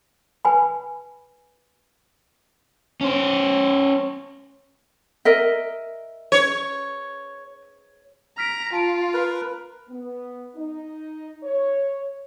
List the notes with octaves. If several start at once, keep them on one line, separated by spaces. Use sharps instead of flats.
B4 G#5 B5
C#4 C5
A#4 D#5 E5
C#5
A#5 F6 B6 D7
F4 A5 D7
A#4 B4
B3
D#4
C#5